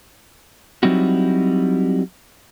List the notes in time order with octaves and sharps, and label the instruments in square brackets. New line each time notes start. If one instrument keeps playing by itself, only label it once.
[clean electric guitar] F#3 G3 C4 D#4 E4 F#4